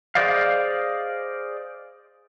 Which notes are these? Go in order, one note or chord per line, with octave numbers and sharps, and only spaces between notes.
G#4 C5 D5 D#5 F5